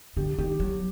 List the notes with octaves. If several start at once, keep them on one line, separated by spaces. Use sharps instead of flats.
D3 G4
D#3 G4
F#3